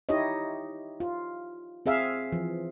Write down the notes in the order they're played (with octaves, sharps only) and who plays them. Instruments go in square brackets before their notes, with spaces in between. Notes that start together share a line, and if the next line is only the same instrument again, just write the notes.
[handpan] D#4 E4 G4 C#5 D#5
F4
C4 G#4 E5 F5
E3 F3